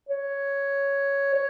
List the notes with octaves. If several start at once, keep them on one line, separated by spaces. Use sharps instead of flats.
C#5
C#5